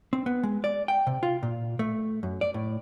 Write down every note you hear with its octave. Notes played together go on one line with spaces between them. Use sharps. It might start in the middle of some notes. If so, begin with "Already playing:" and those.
C4
B3
G#3
D5
G5
C3
F4
A#2
A3
F#2
D5
A2